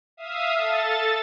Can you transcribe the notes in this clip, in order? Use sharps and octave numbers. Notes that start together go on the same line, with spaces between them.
E5 F5 D#6
A4 A6